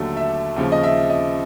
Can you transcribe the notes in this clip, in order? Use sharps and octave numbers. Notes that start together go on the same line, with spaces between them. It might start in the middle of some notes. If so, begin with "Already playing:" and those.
Already playing: D#2 D3 F#3 A3
E5
D#2 C#3 F3
D#5
E5
D#5